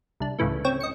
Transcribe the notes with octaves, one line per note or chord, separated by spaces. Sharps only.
C2 D4
C#2 A2 C#3 E3 A3
C4 C#5 G5
D#5 C#7